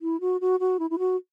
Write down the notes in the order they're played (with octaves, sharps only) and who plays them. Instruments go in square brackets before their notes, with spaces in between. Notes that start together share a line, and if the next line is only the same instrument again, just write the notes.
[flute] E4
F#4
F#4
F#4
E4
E4
F#4